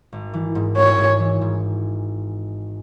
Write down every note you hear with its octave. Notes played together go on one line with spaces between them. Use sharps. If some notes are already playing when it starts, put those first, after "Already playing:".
G#1
E3
G#2
G#1 C#5
G#2
E3
G#2